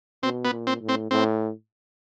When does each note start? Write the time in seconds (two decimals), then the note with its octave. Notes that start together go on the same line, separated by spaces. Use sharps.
0.23 B2 C4
0.45 B3
0.52 A#2
0.67 C4
0.81 A2
0.89 C4
1.11 A2 C4